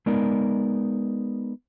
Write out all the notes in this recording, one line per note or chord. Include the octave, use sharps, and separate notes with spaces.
G#3 B3 D#4 A#4 D5